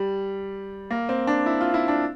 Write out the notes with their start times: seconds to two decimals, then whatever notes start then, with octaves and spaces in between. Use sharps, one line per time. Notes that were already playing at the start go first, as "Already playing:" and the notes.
Already playing: G3
0.91 A#3
1.09 C4
1.27 D4
1.46 E4
1.61 F4
1.74 E4
1.88 D4